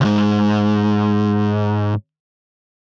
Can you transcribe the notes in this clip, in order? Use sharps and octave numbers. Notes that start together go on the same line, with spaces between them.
D2 G#2